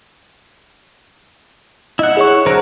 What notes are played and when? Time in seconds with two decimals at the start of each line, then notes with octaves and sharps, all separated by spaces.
1.99 E4 D#5 F#5
2.17 G#4 C#5 C#6
2.46 D3 F#3 A#4 C5